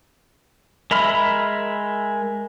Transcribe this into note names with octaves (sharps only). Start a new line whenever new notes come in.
G#3 A#4 E5 B5 F6